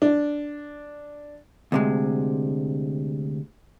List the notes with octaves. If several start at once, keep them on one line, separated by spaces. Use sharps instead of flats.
D4
D2 C3 G#3